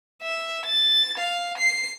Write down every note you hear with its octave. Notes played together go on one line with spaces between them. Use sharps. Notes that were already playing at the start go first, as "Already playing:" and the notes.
E5
A6
F5
C7